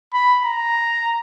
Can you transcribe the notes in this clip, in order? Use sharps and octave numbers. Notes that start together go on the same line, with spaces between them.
B5
A#5